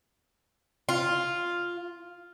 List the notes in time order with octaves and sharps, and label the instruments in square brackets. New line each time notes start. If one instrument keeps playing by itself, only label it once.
[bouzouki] F4